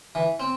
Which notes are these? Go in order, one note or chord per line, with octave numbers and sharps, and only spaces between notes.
E3
C4